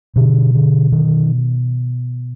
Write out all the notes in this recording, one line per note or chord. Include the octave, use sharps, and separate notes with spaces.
B2 D3
D3
D#3